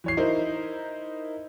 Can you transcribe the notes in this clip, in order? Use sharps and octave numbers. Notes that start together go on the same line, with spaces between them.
E3 C#5 C7
D#4 E4 A#4 C5